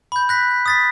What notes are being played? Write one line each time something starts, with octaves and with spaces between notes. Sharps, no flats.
B5 G6
F#6 A#6 B6
D#6 A6 B6